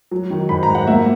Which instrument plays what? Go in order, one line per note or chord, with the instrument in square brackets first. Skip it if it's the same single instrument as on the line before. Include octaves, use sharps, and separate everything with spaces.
[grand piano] F#3
D#3
G#2 B5
A#5
G#2
F#5
A#3 E5